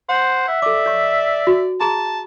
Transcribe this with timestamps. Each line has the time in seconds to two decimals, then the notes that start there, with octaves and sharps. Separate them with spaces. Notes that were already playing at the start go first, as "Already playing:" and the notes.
0.09 C5 F#5
0.48 E5
0.62 A4 D5 D6
0.86 C#5 C#6
1.47 F#4
1.80 G#4 A5 A#5 C6